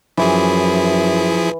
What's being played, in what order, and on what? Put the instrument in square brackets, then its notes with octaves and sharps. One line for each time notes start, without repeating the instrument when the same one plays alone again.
[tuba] F#2 [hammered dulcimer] E3 [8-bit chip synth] F3 E4 G#4